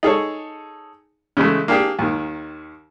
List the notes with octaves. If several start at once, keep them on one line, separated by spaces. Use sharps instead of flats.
D#4 G#4 A4 C#5
C#3 E3 G#3 A3
A#3 D4 G4 G#4
D#2 D#3